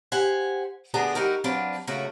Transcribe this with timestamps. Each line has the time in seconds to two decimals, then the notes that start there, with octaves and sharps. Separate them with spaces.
0.12 G4 C5 F#5 G#5
0.94 D2 A3 B3 D4 G#4 A#5
1.15 G3 D#4 F#4 G4 A#4
1.44 F#3 C4 D4 B4 F5
1.87 F#2 C#3 A3 A#3 F#4 A#5